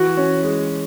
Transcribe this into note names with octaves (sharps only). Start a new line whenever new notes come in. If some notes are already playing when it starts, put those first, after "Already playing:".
Already playing: E3 F#4
C#4
G#3